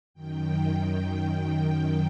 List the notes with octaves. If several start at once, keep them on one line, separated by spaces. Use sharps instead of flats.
F#2 D#3 G5